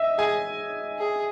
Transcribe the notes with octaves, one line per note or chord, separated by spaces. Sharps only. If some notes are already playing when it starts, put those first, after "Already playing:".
Already playing: D#5 E5
G#4 G#5
G#4